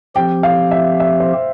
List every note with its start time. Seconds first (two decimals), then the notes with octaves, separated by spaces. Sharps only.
0.15 F3 C4 G4 G5
0.43 F5
0.71 E5
1.00 E5
1.20 C5